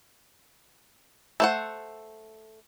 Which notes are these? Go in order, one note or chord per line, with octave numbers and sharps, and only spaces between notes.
A3 C5 F#5